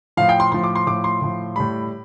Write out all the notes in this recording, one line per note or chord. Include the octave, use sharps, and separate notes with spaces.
A2 F3 F5
G5
C6
A2 F3 C6
D6
C6
A2 F3 D6
C6
A2 F3
A2 G3 B5